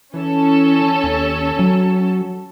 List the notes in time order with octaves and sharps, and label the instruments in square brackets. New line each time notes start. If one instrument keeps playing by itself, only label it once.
[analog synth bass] E3 [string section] C#4 A4
[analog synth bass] D#2
F#3